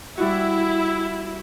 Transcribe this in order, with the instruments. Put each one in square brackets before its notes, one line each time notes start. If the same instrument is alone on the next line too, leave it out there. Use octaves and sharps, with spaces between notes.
[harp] G3 F#4 [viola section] E4